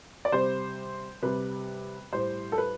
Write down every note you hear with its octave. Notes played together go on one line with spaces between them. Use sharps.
D5
C3 G3 C5
C3 G3 B4
A2 G3 C5
A4
B4